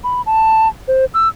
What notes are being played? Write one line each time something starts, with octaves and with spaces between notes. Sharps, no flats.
B5
A5
C5
E6